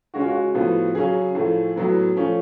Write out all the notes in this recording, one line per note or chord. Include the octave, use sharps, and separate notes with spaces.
C#3 G#3 C#4 F#4
F4
F#4
A2 F3 B3
C#3 F#3 C#4 G#4
A2 F3 A3
A2 F#3 B3
F3 A3 C#4